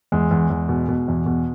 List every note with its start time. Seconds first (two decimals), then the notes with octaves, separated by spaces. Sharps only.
0.12 E2 G#3
0.31 E2
0.50 E2
0.69 B2
0.89 B2
1.08 E2
1.26 B2